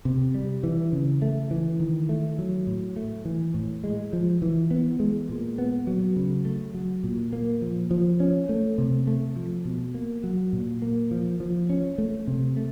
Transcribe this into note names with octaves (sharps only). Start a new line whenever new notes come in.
C3
G3
E3
C#3
A3
E3
D#3
A3
F#3
A2
A3
E3
A2
G#3
F3
E3
B3
G#3
A#2
B3
F#3
C#3
A3
F#3
A#2
A#3
F3
F3
C#4
A3
C3
A3
F3
B2
A#3
F#3
A#2
A#3
F3
F3
C#4
A3
C3
A3